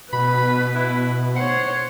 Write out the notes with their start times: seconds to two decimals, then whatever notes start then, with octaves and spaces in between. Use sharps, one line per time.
0.13 B2 B4 B5
0.75 E4
1.36 C5 C#5 F#5